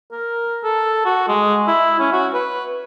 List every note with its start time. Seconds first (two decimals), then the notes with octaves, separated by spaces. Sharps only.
0.12 A#4
0.64 A4
1.05 F#4
1.28 G#3
1.67 E4
2.00 C#4
2.12 F#4
2.33 B4